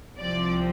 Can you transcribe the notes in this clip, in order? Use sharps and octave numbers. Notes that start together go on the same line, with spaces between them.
C2 C3 F3 C4 D5